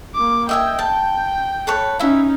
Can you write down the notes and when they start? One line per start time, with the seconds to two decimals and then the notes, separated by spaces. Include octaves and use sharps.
0.15 A#3 D6
0.49 D#5 E5 G5 G#5
0.79 A5
1.67 A4 B4 C#5
1.99 C#4 D#4 E4 E5